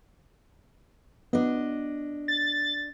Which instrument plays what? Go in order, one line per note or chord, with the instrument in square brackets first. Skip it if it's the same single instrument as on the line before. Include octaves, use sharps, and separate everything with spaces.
[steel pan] B3 [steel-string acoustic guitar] D4 D#5
[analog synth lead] A6